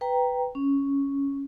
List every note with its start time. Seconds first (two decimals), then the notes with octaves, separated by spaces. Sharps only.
0.01 B4 G5 A#5
0.55 C#4